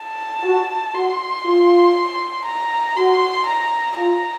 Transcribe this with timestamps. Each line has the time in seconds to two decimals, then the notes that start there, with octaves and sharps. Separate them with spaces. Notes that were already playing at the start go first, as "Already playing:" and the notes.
Already playing: A5
0.43 F#4
0.94 F#4 C6
1.45 F4
2.45 A#5
2.96 F#4 C6
3.47 A#5
3.97 F4 A#5